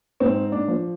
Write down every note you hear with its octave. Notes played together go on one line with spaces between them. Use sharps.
G#2 C4
D4
F3